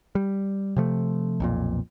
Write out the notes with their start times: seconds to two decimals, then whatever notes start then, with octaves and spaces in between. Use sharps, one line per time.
0.15 G3
0.76 C3 F3 A3
1.40 B1 F2 A#2